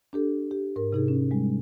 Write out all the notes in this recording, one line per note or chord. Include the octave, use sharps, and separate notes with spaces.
D4 G4 A4
G4
G#2 A#4
C3 D#4 G#4
C#4
G3 G#3